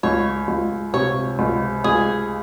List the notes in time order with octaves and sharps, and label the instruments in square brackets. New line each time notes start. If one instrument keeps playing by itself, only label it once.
[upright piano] C#2 [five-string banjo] C#5
[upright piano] C#2
[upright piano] C3 [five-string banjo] C#5
[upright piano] C#2
[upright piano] C#2 [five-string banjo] G#4